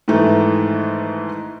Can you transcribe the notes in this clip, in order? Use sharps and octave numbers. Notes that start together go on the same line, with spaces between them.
G#2 D#3 E3 A3